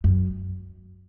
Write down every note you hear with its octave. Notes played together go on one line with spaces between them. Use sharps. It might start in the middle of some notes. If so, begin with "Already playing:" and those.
F#2